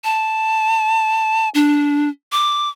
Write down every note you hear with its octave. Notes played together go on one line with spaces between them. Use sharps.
A5
D4
D6